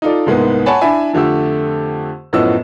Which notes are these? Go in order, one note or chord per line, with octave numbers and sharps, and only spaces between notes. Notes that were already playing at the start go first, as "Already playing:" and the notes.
D#4 F4 A4 D5
C2 G#2 G#3 A#3 B3
C#5 F#5 G#5 A5 B5
D4 E4 E5 G#5 B5
F2 D3 A3 G4 E6
F#2 A2 F3 B3 D#5 E6